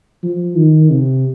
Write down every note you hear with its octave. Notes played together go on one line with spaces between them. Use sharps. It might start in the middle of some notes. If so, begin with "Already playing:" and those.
F3
D#3
C3